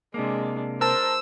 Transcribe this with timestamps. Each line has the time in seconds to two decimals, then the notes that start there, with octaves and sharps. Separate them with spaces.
0.14 C3 G#3 A#3 D4
0.81 A#4 C5 A5 E6